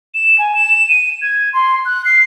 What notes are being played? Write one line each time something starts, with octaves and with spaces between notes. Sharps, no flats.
E7
G#5
E7
D#7
G#6
C6
F#6
C7